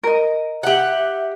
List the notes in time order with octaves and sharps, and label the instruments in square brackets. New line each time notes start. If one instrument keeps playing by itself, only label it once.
[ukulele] A#4 D#5
[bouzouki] G4 F#5 [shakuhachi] E5